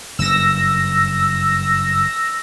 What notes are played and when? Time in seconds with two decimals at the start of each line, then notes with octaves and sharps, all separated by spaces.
0.19 F#1 G2 E6 A#6